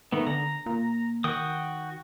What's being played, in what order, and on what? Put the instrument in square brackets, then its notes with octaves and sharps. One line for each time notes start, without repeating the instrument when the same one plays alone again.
[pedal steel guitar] D#3 A3 B3
[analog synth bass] D3 [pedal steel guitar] A#5
[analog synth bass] A#2
[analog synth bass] D#3 [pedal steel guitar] F#4 G5 D#6